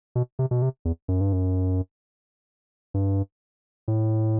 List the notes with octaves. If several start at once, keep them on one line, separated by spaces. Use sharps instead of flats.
B2
C3
B2
C3
E2
F#2
G2
F#2
G2
A2